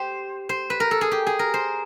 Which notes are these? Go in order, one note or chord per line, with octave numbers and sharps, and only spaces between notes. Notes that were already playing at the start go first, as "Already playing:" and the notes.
Already playing: G4 C5
C5
B4
A#4
A4
G#4
G4
G#4
A#4
C5